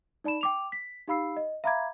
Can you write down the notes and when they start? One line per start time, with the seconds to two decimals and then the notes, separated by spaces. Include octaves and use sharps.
0.24 D#4 D5 A5 B5 E7
0.41 G5 D6 F7
0.72 B6
1.07 D#4 G4 F5 B5 E6 C7
1.37 D#5
1.64 E5 F5 A#5 B5 D6 G#6